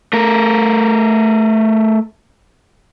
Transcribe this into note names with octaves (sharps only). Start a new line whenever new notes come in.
A3 A#4